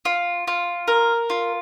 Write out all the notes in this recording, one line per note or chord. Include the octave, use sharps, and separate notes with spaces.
F4
F4
A#4
F4